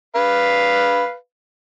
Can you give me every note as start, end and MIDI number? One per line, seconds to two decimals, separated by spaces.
0.16 1.14 71
0.16 1.14 77